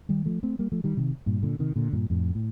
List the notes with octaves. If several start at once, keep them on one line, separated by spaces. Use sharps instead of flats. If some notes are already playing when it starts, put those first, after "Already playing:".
D#3 G3
F3 A3
A3 C4
G3 A#3
F3 A3
D#3 G3
C3 D#3
G2 A#2
A#2 D3
C3 D#3
A#2 D3
G2 A#2
F2 A2
A2